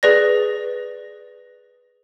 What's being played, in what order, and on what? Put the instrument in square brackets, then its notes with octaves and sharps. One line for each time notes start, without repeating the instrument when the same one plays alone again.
[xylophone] G#4 B4 D5 A#6